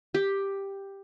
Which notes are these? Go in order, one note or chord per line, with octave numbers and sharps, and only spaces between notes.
G4